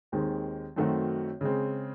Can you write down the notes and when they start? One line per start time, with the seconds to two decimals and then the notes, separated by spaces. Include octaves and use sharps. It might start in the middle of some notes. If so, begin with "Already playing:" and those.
0.12 D#2 D#3 G#3 C4
0.76 F#2 D#3 A3 C4 F#4
1.41 C#3 G#3 C4